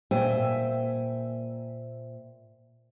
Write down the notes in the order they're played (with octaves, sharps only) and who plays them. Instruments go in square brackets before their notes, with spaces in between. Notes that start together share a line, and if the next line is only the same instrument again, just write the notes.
[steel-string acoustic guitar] A#2 C5 E5 G5 G#5